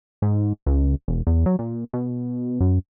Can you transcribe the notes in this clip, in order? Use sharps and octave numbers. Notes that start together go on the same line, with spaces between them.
G#2
C#2
E1
E2
F#3
A#2
B2
F#2